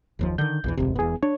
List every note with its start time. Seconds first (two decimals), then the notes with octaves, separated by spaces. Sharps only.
0.19 F#1 D#2 F3
0.38 D3 D#3 G6
0.64 A#1 E2 E3
0.77 D#1 G#1 F2 C3
0.96 E1 E2 B3 G#4
1.23 D4 C#5